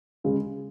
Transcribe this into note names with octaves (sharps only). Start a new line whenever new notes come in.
C#3 G#3